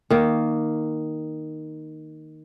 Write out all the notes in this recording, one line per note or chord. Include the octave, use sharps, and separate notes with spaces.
D#3 A#3